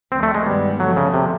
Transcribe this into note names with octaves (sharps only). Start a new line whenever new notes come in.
D2 D3 F3 C4
A3
G#3
G2 D#3 G3 G#3 B3
D3 F3 F#3 A3
C#3
C3